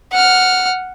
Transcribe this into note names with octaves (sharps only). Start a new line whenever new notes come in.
F#5 F6